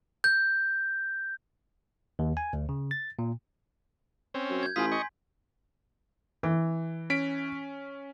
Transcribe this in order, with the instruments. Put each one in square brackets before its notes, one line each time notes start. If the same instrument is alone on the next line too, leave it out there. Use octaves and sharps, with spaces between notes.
[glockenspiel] G6
[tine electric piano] D#2
G#5
D2
C#3
A6
A#2
[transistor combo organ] C4 C#4
[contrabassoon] F#2
[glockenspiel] G6 G#6
[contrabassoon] A1 [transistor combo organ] F4 D#6 [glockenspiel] G#5 C6 B6
[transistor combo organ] D#5 C#6
[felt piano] E3
[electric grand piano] C#4 B6 D7